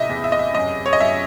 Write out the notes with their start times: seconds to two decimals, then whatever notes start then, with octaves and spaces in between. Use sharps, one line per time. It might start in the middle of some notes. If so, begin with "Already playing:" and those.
Already playing: A2 C3 D#5 E5
0.09 E2
0.24 E5
0.32 D#5
0.39 E5
0.55 F#2 D#5
0.86 C#5
0.93 D#5
1.00 F#2 E5